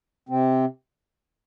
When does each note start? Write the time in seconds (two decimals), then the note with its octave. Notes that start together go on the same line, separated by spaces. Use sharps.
0.29 C3 C4